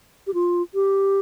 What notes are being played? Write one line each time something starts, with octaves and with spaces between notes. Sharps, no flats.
G4
F4
G4